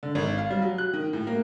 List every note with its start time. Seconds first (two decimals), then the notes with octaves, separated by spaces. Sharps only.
0.03 D3
0.15 G#1
0.38 F5
0.50 G3
0.62 F#3
0.78 F#6
0.93 D#3
1.13 A2
1.27 A#3